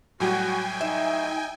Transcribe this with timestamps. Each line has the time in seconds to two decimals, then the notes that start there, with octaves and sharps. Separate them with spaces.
0.20 A2 F#3 G3 F#4 G5 G#5
0.81 D#4 E5